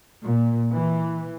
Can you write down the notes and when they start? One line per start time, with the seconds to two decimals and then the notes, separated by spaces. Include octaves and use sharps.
0.24 A#2
0.72 E3